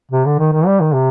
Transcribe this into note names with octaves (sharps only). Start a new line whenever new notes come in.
C3
D3
D#3
D#3
G3
D#3
C3